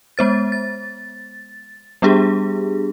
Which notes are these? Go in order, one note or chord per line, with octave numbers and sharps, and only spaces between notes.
G#3 B3 C5 A6
A6
G3 B3 D4 G4 G#4